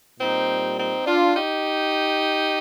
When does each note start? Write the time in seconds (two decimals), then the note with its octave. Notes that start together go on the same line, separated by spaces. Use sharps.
0.19 A#2 G3 C4 D#4
0.78 C4 D#4
1.06 D4 F4
1.34 D#4 G4